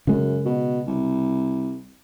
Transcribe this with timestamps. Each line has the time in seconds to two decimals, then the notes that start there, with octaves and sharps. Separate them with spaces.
0.07 F#2 C#3 G#3
0.45 B2
0.87 C2